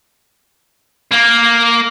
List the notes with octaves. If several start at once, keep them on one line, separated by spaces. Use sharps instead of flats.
A#3